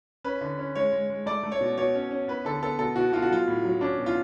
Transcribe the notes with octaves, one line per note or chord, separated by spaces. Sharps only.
C#4 B4
D3
C#4
G#3 C#5
G#3
G#3
A3 D5
A3
C#5
B2
B2 C#5
C#4
C#4
B3 B4
D3 A4
B3 A4
B2 A4
B2 F#4
B2 F4
F#4
F#3 F4
A2
F#3
C#4 D4
B2
F4